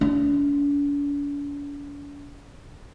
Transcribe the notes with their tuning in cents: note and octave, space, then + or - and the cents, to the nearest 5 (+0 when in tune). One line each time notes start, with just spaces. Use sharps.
D4 -45